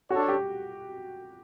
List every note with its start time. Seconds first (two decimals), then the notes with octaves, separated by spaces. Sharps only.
0.10 D4 F#4 A4 C#5
0.28 G4